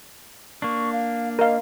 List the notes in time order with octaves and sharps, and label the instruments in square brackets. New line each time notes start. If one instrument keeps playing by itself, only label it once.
[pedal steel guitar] A#3 D4 [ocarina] C#6
[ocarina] F5
[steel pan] A#4 F5 [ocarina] D#5